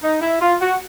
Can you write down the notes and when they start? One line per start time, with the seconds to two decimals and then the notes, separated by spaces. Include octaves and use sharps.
0.03 D#4
0.21 E4
0.41 F4
0.61 F#4